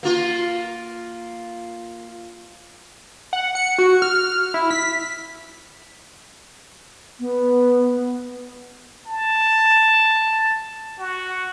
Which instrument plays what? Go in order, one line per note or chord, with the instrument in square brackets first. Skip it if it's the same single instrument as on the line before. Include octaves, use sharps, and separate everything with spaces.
[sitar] A#3 F4
[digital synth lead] F#5
C#7
F#4
F6
E4
B6
[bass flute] B3
[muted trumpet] A5
F#4